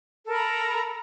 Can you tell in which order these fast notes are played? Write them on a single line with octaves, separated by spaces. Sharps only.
A4 A#4 B5 A#5